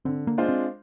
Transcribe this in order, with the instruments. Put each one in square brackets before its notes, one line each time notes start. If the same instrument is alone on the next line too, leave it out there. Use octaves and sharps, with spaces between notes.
[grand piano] D3 [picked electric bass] C4
[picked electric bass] A#3
[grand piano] G#3 D4 F4 C5
[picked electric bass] C4